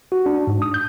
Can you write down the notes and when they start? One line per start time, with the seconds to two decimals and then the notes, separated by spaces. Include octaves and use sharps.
0.12 F#4
0.26 D4
0.47 G#2
0.62 D#6
0.74 G6